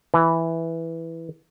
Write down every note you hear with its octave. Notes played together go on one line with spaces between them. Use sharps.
E3